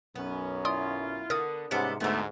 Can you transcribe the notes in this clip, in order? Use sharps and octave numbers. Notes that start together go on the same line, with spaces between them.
B1 F#2 B3 C#4
E4 F4 D5 C6 D#6
D3 B3 A#4 D#6
G#2 C3 G3 B3 C#4 A4 F#5 C#7
D2 G#2 A3 B3 A4